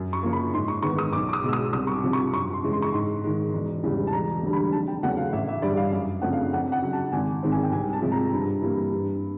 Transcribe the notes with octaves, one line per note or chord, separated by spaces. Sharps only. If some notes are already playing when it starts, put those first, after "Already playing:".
Already playing: F#2
C#6
C#3 F3 A#3
B5
G#2 C6
C#6
D#3 G#3 B3 C#6
D#6
B1 D6
D6
D#6
B2 G#3 E6
D#6
C2 D#6
C#6
D6
C3 F3
C#6
F#2 C#6
C6
C#3 E3 G#3
C6
C#6
G#2 C6
D#3 G#3
E1
E2 C#3 E3 G3
A5
E1 A#5
D2 D3 G3
B5
F1 A5
G5
E2 C#3 F#3 A3 F#5
F5
A1 E5
E5
G2 D3 G3 D5
F5
F#2 F5
C#3 F3 A3 C4 F#5
F5
F2 F#5
F#5
C#3 F#3
A5
G#1 G#5
G#2 D#3 G#3 C4
G#5
G5
C2 G#5
A5
C3 F3 G#3
A#5
G2
E3 G3 A#3
G2